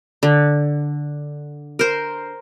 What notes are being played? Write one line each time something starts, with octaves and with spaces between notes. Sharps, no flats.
D3
A#4 C5